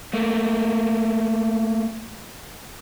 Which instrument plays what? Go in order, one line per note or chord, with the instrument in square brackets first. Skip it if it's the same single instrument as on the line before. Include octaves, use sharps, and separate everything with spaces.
[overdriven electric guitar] A3 A#3